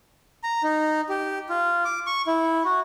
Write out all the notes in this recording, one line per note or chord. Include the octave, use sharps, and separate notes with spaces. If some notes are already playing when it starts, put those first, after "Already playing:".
A#5
D#4
G4
F4
D6
C#6
E4
F#4